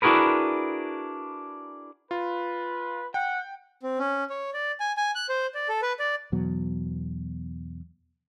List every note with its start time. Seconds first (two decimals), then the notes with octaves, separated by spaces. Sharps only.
0.02 D4 E4 F#4 G#4 A#4 B4
2.11 F4 B4
3.14 F#5 G5
3.83 C4
3.99 C#4
4.30 C#5
4.54 D5
4.80 G#5
4.97 G#5
5.15 F#6
5.29 C5
5.55 D5
5.69 A4
5.82 B4
6.00 D5
6.32 E2 B2 F#3